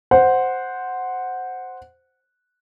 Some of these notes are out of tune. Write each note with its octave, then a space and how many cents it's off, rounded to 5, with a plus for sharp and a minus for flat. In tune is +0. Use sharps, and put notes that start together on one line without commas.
C5 -5 F#5 -5